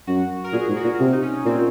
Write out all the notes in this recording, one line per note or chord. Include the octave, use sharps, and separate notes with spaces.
F#2 F#4
A#4
A#2 G#4
G#2
F#4
A#2
C3
D#4
C#4
A#2 C4